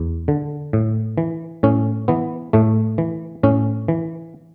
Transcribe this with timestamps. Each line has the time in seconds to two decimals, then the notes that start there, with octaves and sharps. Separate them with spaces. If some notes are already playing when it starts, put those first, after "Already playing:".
Already playing: E2
0.28 D3
0.73 A2
1.18 E3
1.63 A2 C#4
2.08 E3 B3
2.53 A2 A3
2.98 E3
3.43 A2 C#4
3.88 E3